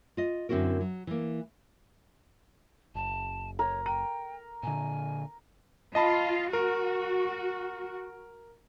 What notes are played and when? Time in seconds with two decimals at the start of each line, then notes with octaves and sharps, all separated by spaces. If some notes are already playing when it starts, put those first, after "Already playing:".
0.17 F4 D#5
0.49 F#2 D3 C4 E4 F#4 A#4
0.81 F#3
1.07 E3 A#3
2.95 F#1 A5
3.59 A#4 C#5
3.86 G5 A#5
4.63 A#2 D3 G#5
5.95 F4 D#5 A5 B5
6.53 F#4 A#4